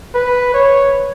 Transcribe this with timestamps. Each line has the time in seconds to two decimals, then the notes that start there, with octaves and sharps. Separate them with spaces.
0.15 B4
0.54 C#5